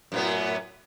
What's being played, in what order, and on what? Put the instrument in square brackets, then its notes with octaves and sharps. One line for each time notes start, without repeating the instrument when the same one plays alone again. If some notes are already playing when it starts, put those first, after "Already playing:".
[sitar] F#2 A2 B3